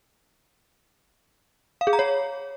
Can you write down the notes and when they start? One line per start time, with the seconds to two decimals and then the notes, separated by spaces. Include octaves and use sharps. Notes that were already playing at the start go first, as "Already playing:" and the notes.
1.81 F5
1.87 G#4
1.93 A#5
1.99 C#5